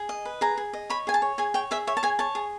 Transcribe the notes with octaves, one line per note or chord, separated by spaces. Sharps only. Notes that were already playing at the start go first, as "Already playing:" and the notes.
Already playing: G#4
D#5
B4
G#4 A#5
G#4
D#5
C#5 B5
G#4 G#5
A5
C#5
G#4 G#5
C#5 G5
G#4 E5
C#5 E5
A5
G#4 G#5
C#5 A5
G#4